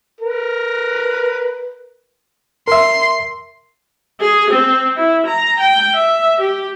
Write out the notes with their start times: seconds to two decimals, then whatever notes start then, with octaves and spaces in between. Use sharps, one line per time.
0.21 A#4 B4
2.68 A#4 E5 C6
4.20 G#4
4.50 C4
4.96 E4
5.26 A#5
5.59 G5
5.96 E5
6.40 G4